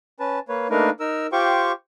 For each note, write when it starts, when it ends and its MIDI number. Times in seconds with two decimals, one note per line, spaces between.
0.20 0.39 61
0.20 0.39 71
0.20 0.39 81
0.49 0.67 58
0.49 0.67 71
0.49 0.67 73
0.70 0.90 57
0.70 0.90 58
0.70 0.90 62
0.70 0.90 63
0.70 0.90 70
0.70 0.90 71
1.00 1.27 63
1.00 1.27 70
1.00 1.27 88
1.32 1.72 65
1.32 1.72 67
1.32 1.72 72
1.32 1.72 79
1.32 1.72 85
1.32 1.72 86